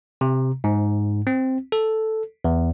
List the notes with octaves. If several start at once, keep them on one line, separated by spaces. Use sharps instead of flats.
C3
G#2
C4
A4
E2